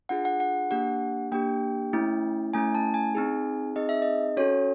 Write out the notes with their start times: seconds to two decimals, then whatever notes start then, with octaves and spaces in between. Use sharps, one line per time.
0.09 D4 F4 G#4 F#5
0.25 F#5
0.40 F#5
0.71 A#3 D4 G4 F#5
1.32 A#3 D4 G4 G5
1.93 A3 C#4 E4
2.53 A3 C#4 E4 G#5
2.75 A5
2.94 G#5
3.15 C4 D#4 G#4
3.76 C4 D#4 G#4 D#5
3.89 E5
4.02 D#5
4.37 C#4 F#4 A4 C#5